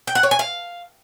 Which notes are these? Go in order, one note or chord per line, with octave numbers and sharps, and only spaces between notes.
G5
F#5
C#5
G#5
F5